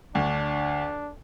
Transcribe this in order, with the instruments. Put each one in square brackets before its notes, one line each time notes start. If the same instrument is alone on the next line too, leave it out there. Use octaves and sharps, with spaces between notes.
[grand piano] D2 [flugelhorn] D4